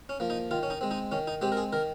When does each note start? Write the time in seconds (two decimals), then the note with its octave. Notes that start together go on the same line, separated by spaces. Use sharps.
0.09 C#4
0.20 F3 A#3
0.30 D#4
0.51 D#3 F4
0.63 C#4
0.70 D#4
0.81 G#3 C4
0.91 D#4
1.12 D#3 C#4
1.27 D#4
1.41 G#3 C4 G4
1.52 A#4
1.57 G#4
1.73 D#3 A#4